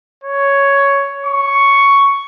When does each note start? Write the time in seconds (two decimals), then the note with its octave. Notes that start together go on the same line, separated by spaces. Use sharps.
0.23 C#5
1.26 C#6